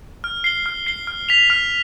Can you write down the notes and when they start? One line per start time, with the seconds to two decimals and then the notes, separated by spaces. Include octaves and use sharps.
0.24 F6
0.44 C7 G7
0.66 F6
0.87 C7 G7
1.07 F6
1.29 B6 F7
1.50 F6